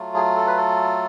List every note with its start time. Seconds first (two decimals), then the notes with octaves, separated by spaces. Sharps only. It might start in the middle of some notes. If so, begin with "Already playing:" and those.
Already playing: F#3 A3 F4
0.15 G#4
0.37 A4
0.47 B4
0.57 A4